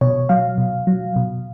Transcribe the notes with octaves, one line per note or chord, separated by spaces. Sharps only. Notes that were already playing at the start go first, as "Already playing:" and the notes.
B2 C#5
F#3 F5
B2
F#3
B2